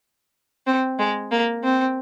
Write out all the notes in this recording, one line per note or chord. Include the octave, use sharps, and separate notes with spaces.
C4
G#3
A#3
C4